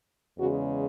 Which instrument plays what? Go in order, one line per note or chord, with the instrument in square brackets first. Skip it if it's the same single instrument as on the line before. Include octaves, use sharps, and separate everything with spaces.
[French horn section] E2 C#3 G#3 F#4